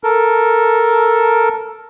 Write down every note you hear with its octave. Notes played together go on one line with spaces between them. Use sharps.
A4 A#4